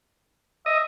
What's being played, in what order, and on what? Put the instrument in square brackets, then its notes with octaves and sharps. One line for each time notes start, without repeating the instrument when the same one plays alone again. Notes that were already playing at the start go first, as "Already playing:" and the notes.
[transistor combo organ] D#5 [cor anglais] E5